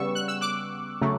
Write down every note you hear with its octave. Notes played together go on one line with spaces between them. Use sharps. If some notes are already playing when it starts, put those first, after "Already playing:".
Already playing: C#3 G3 B3 C#6 E6
F#6
E6
D6 F#6
C#3 F#3 A3